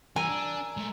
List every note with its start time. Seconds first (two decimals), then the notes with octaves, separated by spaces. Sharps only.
0.16 E3 G3 A#4 G#5 A#5 E6
0.29 D4
0.77 G#3 A3